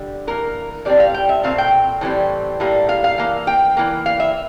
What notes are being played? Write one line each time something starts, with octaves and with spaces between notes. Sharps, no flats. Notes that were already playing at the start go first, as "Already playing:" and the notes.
Already playing: D3 G3
E3 A#3 A#4
A2 G3 C4 D5
F5
G5
E5
A#2 A3 C4 F5
G5
A2 E3 G3 C4
A2 G3 A#3
F5
F5
E3 A#3
G5
E3 A#3
F5
E5